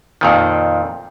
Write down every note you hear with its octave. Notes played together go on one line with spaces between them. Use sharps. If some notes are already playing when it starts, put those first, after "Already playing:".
F2 A#2 D#3